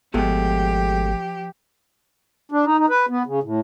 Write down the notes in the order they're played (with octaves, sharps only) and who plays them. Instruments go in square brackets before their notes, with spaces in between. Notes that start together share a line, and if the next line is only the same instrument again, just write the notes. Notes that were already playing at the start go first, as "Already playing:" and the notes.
[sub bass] G#1 [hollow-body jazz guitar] B2 G#3 A3 [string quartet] F3 G4
[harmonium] D4
D#4
D#4
B4
B3
C#3
A2